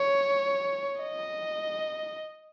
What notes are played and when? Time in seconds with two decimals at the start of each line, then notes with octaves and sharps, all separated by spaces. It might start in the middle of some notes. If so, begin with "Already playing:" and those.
Already playing: C#5
1.01 D#5